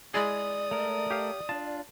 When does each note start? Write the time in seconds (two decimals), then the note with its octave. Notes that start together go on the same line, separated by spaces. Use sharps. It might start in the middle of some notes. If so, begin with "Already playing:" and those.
0.14 G#3 E4 G#4 D5 D#6
0.71 A3 A#4
1.10 G4 F5
1.49 D4 F4 A5